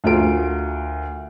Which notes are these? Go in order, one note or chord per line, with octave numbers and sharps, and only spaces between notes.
D2 F4 A#4 D7